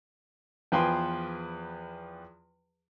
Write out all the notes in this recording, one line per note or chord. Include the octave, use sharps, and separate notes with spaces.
E2 F3 B4 G5 G#5 C6